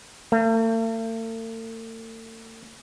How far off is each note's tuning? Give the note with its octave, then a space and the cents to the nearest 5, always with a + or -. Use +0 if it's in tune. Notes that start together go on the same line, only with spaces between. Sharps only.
A3 +45